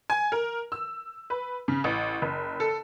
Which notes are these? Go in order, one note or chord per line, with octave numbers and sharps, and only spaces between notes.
G#5
A#4
E6
B4
C#3
A1
F#1
A4